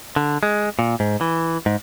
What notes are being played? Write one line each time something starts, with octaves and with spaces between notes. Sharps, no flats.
D3
G#3
A#2
G#2
E3
G#2